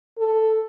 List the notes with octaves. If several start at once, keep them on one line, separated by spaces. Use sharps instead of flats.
A4